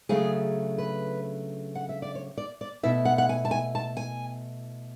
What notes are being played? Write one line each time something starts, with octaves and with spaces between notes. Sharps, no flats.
C#3 F#3 A3 D4 G#4
B4
F#5
E5
D5
C#5
D5
D5
B2 A3 E4 E5
F#5
F#5
G#5
A5
G#5
A5
G#5